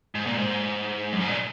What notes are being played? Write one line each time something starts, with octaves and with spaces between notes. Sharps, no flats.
G#2
A#2
G#2
F#2
G#2
A#2